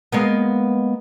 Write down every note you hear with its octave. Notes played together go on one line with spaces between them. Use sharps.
G#3 A#3 B3